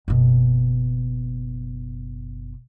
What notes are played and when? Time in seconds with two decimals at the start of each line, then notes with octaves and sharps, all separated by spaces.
0.08 F#1 B2